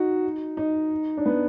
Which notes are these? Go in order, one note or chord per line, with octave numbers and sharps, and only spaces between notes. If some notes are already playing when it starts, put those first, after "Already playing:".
Already playing: D#4 F#4
D#4
D4
B3